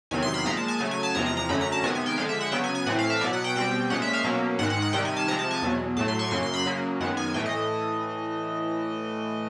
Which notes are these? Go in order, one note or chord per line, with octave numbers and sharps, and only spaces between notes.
E2 C3 D#3 F#3 G#5
C6
B5
A#2 F3 G#3 A#5
A5
G#5
C#3 F#3 A3 G#5
G#5
A5
E2 C3 F3 G#3 A#5
A#5
A#5
F#2 D3 F#3 A3 C#4 B5
A#5
A5
C3 D#3 G#3 B3 G#5
G#5
G5
D3 F3 G#3 F5
E5
F#5
C#3 F#3 B3 G5
G#5
G#5
A2 E3 A3 C4 F#5
F5
E5
B2 F#3 B3 D5
F#5
G5
B2 G3 C4 G5
A#2 F3 G#3 C#4 F#5
E5
F5
B2 F#3 A#3 C#4
G#2 D#3 G#3 F#5
F#5
F#5
C3 D#3 G3 G5
G#5
A5
C3 F3 G#3 A#5
A5
G#5
E2 B2 F#3
A2 F#3 A3 A5
C6
C#6
F#2 C#3 F#3 A#3 C6
C6
B5
C#3 F#3 A#3
F#2 D#3 G#3 B3 F#5
G#5
A2 E3 A3 G5
D#5